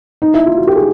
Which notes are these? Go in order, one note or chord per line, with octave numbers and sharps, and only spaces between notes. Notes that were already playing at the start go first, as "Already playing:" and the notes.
D#4
E4
F4
F#4
G4
G#4